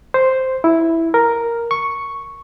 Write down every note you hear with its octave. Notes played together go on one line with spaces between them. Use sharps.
C5
E4
A#4
C#6